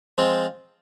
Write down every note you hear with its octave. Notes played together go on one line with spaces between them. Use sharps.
F3 G#3 C4 F4